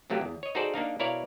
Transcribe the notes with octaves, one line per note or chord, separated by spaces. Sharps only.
C3 F#3 A3 A#3 G4
E2
C#5 D#5
D#4 F#4 G#4 A4 C5 D5
A#3 D4 D#4 F5
B2 E4 A#4 C#5 D5 F5